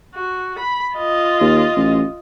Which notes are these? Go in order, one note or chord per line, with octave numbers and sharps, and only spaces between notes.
F#4
B5
F4 D#5
D#2
A1